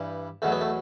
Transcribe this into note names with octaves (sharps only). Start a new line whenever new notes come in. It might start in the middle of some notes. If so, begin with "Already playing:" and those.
Already playing: G2 E3 G3
E2 B2 F#3 A3
B3
A3